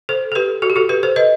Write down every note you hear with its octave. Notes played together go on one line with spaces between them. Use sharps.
A4 C5
A4
G4 B4
F#4 A4
G4
F#4 A4
G4 B4
A4 C5
B4 D#5